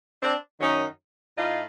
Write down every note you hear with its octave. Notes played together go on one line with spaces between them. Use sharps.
C4 D4
F#2 D#3 F#3 C#4 D#4
A2 D#4 F4